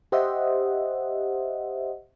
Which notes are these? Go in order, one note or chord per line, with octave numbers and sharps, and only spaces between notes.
G4 C5 D#5 E5 F#5